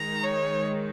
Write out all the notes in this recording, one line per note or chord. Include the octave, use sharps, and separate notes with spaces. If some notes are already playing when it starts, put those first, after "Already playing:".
Already playing: D#3 G#3 D#4 A#5
C#5